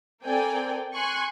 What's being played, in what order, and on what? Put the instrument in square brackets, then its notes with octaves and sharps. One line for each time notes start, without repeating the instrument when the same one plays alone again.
[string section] C4 A4 A#4 D5 G5 G#5
G#5 C6 C#6 F#6